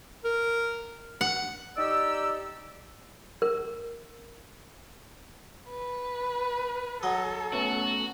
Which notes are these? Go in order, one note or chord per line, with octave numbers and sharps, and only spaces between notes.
A#4
F#5
D#4 G4 D5 E6
A#4
B4
F#3 A4 D#5
A3 B3 C#4 F#4